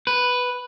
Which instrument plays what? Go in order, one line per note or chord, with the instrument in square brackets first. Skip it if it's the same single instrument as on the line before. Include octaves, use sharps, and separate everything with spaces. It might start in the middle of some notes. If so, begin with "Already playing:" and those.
[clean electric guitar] B4